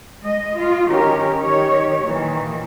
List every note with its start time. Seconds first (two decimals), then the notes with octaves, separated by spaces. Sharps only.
0.22 G#3 D#5
0.55 F4
0.87 D#3 C#4 G4 A#4
1.40 D#3 G4 C#5
2.02 A#2 D#3 E3